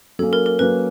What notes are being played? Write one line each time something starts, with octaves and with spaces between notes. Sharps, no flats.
F#3 A#3 C#4 A4
A#4
A#4
F#3 A#3 C#4 B4